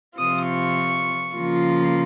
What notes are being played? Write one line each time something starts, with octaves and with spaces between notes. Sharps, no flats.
C3 F3 C4 F4 D#6
C#6
C#3 F3 A#3 F4